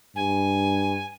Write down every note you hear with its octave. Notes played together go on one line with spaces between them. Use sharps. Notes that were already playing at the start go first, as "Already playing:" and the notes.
G2 G#5